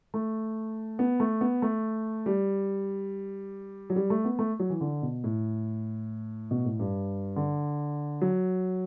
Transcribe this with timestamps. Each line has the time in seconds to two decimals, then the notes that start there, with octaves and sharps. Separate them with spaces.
0.14 A3
0.99 B3
1.20 A3
1.41 B3
1.62 A3
2.26 G3
3.90 F#3
3.96 G3
4.10 A3
4.25 B3
4.39 A3
4.60 F#3
4.70 E3
4.81 D3
5.02 B2
5.24 A2
6.51 B2
6.65 A2
6.79 G2
7.36 D3
8.22 F#3